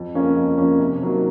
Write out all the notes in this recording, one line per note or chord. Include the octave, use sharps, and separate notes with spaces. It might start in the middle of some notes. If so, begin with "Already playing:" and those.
Already playing: F2
C#3 F3 A#3 C#4
F2
C#3 F3 A#3 C#4
C3
D#3 F#3 A#3